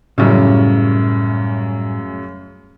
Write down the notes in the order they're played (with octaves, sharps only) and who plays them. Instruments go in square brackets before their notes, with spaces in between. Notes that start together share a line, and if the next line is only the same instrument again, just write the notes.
[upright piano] F#2 C#3 [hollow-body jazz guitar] A2 G3